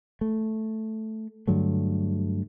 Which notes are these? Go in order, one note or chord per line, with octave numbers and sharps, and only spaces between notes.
A3
G2 D3 F#3 A3